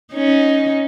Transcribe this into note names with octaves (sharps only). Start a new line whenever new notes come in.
C#4 D#4